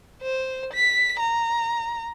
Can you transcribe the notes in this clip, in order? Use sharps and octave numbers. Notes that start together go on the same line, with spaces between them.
C5
B6
A#5